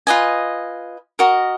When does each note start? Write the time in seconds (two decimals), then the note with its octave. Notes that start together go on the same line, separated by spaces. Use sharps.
0.07 F4 B4 D#5 G#5
1.19 F#4 A#4 D#5